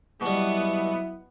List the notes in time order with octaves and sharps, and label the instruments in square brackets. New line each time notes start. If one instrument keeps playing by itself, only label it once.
[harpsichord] B2 G3 [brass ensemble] F#3 E4 B4 [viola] B3